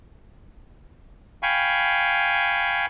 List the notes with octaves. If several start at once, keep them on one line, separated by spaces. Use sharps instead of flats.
F5 G5 G#5 B5 C#6